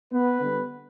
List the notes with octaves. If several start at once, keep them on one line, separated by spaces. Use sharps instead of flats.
B3 B4
D3 G3 B3